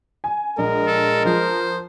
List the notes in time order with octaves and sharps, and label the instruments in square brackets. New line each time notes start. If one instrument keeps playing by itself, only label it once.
[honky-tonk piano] G#5
[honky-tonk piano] A#1 [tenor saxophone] G#3 [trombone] A#4
[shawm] A4
[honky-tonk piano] F3 [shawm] C5